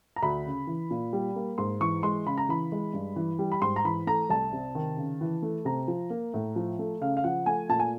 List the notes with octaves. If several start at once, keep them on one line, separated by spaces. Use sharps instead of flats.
A#5
D2 B5
C#3
E3
A#2
G3
A#3
G#2 C6
E3 C#6
G#3 C6
C#3 B5
A#5
E3 B5
G#3
G2
E3
G3
B5
G#2 C6
A#5
E3 B5
A3 A#5
C2 A5
C3
D#3
C#3
E3
A3
C3 A#5
F3
A#3
A2
F3
A3
C#3 F5
F5
F3 F#5
A3 G#5
A#2 A5
G#5